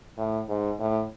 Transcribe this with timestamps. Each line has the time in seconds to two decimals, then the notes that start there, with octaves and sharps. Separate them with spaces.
0.17 A2
0.49 G#2
0.80 A2